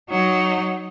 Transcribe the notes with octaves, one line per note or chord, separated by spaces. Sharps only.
F#3 D#4